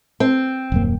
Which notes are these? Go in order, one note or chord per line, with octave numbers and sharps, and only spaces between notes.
C4
D#1 F#2 A#3